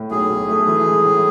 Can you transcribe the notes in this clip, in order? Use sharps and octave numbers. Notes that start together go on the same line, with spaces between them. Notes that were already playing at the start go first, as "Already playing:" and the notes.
Already playing: A2
B1 G#4
B1
A3
E3
G#3
A2